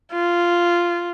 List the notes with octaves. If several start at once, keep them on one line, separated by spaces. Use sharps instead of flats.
F4